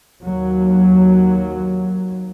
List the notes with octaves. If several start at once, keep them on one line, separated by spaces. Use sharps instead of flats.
D#2 F#3